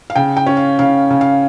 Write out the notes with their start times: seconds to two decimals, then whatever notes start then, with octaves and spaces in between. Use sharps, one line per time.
0.10 F5
0.16 C#3 G5
0.37 G5
0.46 C#4
0.57 F5
0.79 C#3 F5
1.10 C#3
1.21 F5